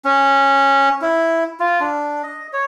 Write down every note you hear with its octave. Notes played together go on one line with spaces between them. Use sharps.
C#4
E4
F4
D4
D#5
C#5